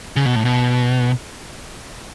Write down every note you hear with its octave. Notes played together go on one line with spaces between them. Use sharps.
C#3
B2
A2
B2